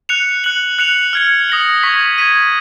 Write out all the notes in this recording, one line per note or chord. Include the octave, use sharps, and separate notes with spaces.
F#6 C#7 F7
F#6 C#7 F#7
F#6 C#7 F7
F6 G#6 C#7
D#6 A#6 C#7 F#7
C#6 G#6 B6
G#6 B6 D#7